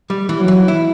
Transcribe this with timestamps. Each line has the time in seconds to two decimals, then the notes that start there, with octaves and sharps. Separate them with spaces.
0.10 G3
0.29 E3
0.39 F#3
0.48 E3
0.68 E4